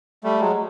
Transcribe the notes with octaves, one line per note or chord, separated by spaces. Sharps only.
G3 A3
F#3 G#3